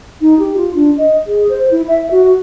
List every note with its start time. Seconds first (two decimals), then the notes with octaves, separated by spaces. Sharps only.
0.21 D#4
0.39 G4
0.57 F4
0.75 D4
0.98 D#5
1.27 G#4
1.49 C5
1.71 E4
1.88 E5
2.11 F#4